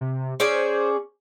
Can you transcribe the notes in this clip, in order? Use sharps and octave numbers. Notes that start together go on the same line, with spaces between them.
C3
C#4 G#4 C5 D5